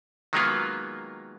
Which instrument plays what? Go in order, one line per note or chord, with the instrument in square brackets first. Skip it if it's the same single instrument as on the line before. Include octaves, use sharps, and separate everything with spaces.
[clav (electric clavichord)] D#3 F#3 G#3 A#3 B3 F4